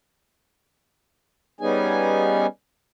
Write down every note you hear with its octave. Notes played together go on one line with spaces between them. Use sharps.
G3 B3 C#4 D#4 G#4 G#5